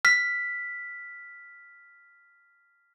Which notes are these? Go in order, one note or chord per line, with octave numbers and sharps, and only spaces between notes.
F6 B6